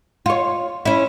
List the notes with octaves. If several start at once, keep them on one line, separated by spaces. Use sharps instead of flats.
F4 C#5
C#4 E4